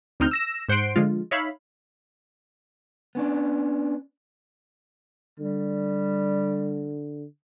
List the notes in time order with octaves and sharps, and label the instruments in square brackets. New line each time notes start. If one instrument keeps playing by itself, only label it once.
[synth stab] D2 C3 C4 D#4 F6 G6
E6 A#6 E7
G#2 C5 F#5 C6 D7
D3 F3 G#3 F4
D#4 C#5 E5 F5 B5
[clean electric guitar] B3 C#4 D4
[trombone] D3 [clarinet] G3